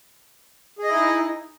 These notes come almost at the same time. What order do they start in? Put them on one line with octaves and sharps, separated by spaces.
G#4 D#5 E4 D#4